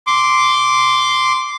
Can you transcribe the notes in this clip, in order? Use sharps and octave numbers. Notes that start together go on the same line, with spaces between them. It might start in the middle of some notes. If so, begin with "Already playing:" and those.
C6 D6